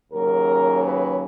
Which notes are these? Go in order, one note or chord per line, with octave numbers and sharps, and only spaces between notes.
D#2 C#3 F#3 A#4
B4